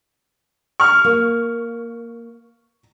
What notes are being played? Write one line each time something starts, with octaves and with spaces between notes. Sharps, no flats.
C#6 F6
A#3